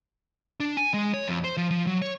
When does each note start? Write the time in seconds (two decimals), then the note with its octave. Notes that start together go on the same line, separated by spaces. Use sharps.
0.60 D4
0.77 G#5
0.94 G#3
1.14 C#5
1.28 F2
1.44 C5
1.57 F3
1.71 F3
1.87 F#3
2.02 C#5